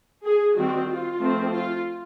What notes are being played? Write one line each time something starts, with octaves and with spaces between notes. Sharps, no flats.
G#4
D#3 G3 C4 F#4
F4
F3 A3 C4
F4